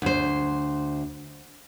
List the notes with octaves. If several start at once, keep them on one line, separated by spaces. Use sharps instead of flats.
D2 C5